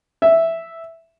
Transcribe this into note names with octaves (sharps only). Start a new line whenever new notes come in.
E5